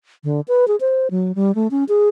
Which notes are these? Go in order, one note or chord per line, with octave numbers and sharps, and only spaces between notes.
D3
B4
G#4
C5
F#3
G3
A3
C#4
G#4